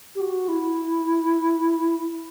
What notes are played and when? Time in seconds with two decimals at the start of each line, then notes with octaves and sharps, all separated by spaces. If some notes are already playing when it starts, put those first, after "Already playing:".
0.15 G4
0.20 F#4
0.48 E4